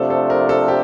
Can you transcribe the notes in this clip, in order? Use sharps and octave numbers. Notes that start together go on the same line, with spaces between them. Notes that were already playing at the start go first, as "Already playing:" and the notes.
Already playing: C3 F3 A3 D4 A4
A4
A#4
A4
G4